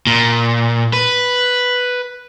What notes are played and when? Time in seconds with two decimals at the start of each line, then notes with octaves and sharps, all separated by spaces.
0.07 A#2
0.93 B4